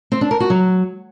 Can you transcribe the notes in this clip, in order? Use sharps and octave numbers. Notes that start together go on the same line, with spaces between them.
C4
D4
A#4
F#4
F#3